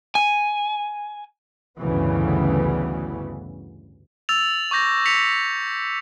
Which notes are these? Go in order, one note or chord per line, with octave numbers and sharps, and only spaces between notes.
G#5
A1 D2 G2 C#3 E3 B3
E6 A6 F7
C#6 D6 G6 A#6
A#6 B6 C#7 F7